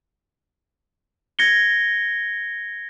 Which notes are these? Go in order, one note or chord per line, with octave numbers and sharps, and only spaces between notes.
G#6 A#6 C#7 G7